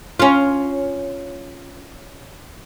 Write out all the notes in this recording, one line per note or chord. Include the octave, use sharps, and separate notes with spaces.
C#4 F4